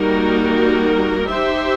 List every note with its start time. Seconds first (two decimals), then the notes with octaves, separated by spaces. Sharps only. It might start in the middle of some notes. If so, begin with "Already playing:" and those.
Already playing: G3 A#3 D#4 F#4 A#4
1.29 D#4 G4 C5 E5